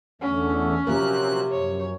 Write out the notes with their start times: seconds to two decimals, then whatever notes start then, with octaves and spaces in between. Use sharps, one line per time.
0.21 E2 D3 A3 C#4
0.87 C3 F3 F#3 A#3 C4 A#4 F#6
1.51 F#2 C#5